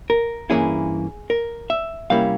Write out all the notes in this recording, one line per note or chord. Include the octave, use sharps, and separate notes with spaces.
A#4
G2 E3 A#3 C#4 E4 G#4
A#4
E5
C3 G3 A#3 C#4 E4 F5